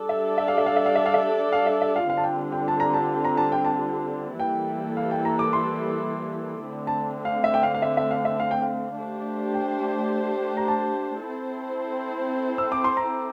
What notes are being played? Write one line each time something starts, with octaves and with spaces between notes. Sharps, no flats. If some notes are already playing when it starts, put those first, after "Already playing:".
Already playing: G3 D4 A4 D5
E5
E5
F5
E5
F5
E5
F5
E5
F5
E5
F5
E5
E5
F5
D3 G3 C4 F4 F5
A5
G5
G5
A5
A#5
A5
A#5
A5
G5
A5
E3 G3 A#3 E4 A4 G5
F5
G5
A#5
D6
C6
D3 A3 C4
A5
F5
E5
G5
F5
F5
E5
E5
F5
E5
F5
G5
F5
A3 D4 G4 C5
G5
A#5
A5
C4 E4 A4 C5
E6
D6
C6
A#5